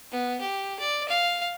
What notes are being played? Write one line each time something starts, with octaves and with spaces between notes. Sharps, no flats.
B3
G4
D5
F5